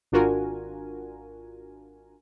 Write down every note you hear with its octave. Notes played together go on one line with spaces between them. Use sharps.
G#1 D4 F4 F#4 A#4 G#5